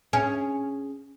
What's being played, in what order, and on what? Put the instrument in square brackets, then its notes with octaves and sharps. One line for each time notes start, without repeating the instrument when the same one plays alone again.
[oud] C#4 G#4